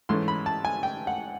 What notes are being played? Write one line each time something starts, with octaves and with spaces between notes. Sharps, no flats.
G#2 E3 A3 C#4 C6
B5
A5
G#5
G5
F#5